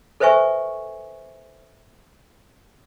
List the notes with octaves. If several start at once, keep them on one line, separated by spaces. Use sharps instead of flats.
A4 B4 C5 E5 G#5 C#6